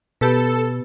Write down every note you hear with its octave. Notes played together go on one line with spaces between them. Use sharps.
B2 B3 G4 A4 B4